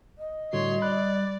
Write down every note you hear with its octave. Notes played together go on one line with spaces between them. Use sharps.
D#5
A2 D3 G3 F#4 C#5 C6
D5 B5 F#6